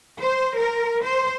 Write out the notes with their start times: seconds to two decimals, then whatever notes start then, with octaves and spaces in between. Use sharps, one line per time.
0.21 C5
0.58 A#4
1.02 C5